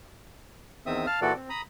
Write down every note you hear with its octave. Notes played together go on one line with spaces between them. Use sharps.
E2 D#3 C4 E5 D#6
F5 A5 F6
A#2 E3 F#4 A4 D5
C4
A#5 B5 D#6